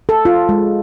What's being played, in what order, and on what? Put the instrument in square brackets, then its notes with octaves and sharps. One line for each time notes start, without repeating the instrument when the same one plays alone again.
[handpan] A4
F4
G#3